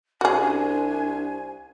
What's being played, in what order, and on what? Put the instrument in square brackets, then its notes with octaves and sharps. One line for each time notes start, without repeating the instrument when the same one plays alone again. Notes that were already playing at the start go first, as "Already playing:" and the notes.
[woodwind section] C2 G#5 [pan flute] C#4 [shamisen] F#4 G#4
[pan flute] D4